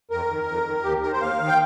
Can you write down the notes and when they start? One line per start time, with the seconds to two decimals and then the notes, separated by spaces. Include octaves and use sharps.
0.11 F2 A#4
0.30 D#3
0.48 F2
0.66 D#3
0.84 D#2 G4
1.02 D#3 A#4
1.12 C5
1.20 D#2 F5
1.39 D#3
1.48 G5